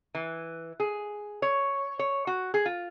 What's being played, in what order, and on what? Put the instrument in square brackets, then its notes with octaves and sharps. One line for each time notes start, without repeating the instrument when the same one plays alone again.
[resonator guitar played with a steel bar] E3
G#4
C#5
C#5
F#4
G#4
F4